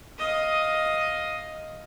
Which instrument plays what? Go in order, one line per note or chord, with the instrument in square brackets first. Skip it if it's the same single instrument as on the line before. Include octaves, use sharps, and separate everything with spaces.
[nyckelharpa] D#5 F5